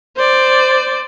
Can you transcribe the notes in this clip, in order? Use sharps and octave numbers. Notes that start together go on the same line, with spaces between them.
C5 D5